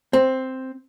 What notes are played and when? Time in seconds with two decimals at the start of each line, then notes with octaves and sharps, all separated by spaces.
0.13 C4